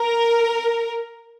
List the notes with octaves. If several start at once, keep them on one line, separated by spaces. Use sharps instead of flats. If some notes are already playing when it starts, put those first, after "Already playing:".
Already playing: A#4